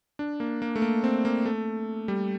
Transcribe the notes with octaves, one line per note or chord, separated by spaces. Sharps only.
D4
A#3
A#3
A3
A#3
C4
A#3
A3
G3